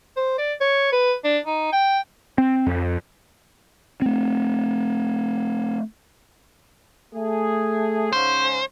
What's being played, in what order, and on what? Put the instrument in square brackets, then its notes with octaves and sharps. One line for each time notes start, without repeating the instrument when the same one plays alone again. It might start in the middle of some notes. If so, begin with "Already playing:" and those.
[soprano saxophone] C5
D5
C#5
B4
D4
D#4
G5
[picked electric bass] C4
F2
[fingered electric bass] A3 C4
[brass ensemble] A3 G#4
[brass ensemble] G#2 C#3 C#4 [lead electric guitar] C5